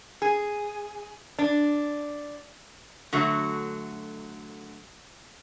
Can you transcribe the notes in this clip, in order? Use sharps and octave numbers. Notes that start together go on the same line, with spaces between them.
G#4
D4
D3 F#3 A3 F#4